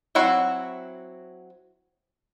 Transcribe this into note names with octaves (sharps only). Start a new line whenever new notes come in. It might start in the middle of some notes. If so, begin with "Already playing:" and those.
F#3 C4 E4 F#4